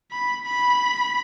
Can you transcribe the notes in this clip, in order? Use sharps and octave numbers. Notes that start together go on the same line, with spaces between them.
B5
B5